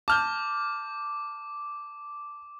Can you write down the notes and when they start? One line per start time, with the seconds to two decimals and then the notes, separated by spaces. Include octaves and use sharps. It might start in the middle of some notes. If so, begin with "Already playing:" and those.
0.08 A5 D6 F6 G6